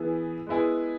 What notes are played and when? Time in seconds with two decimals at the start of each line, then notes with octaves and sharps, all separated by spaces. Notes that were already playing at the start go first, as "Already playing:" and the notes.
Already playing: E3 B3 E4 G#4
0.47 G#3 B3 E4 G#4